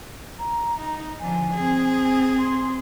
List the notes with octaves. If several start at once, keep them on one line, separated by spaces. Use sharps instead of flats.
A#5
D#4
D3 F3 G#5
C4 G#4
G#5
C6